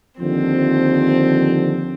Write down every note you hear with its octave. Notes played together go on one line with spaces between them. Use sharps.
D#2 D3 F3 C4